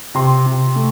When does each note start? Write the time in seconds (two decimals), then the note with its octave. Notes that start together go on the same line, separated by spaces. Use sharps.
0.15 C3 C6
0.46 C3
0.76 A3